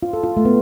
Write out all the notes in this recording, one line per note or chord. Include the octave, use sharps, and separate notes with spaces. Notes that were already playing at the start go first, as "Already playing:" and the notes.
F4
A4
F4
A3
B3